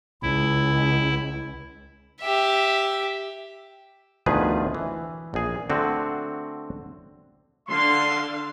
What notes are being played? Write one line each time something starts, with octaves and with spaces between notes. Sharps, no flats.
C#2 E4
G4 E5
D2 B2 D#3 F3 G#4 B4
E3
A#1 G#4
D3 A3 C4 F#4
D3 F5 C6